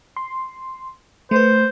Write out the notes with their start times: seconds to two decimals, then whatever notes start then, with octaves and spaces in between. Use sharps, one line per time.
0.17 C6
1.31 A3 B4 C5